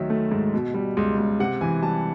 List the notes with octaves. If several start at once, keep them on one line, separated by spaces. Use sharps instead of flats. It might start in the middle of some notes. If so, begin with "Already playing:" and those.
Already playing: D2 D#3 F#3 E5
A3
G#2
B2
G3
C#2
C#2
C3 F#5
E3 G#5
G3 A5